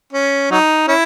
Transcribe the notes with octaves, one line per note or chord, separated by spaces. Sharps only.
C#4
F#3 D#4
C#4 E4